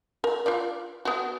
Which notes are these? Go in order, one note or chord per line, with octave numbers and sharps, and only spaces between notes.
A#4
F4 B4 D5
B3 F#4